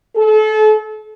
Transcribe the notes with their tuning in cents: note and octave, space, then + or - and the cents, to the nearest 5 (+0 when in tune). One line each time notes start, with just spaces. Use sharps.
A4 -35